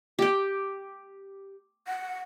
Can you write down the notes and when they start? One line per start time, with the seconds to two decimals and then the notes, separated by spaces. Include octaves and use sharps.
0.19 G4 G5
1.88 F#5